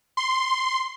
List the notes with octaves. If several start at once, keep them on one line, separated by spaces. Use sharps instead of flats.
C6